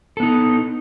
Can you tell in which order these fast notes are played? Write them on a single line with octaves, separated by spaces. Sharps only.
A4 B3 D#4